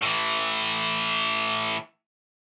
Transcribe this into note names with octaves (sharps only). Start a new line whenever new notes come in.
A2 E3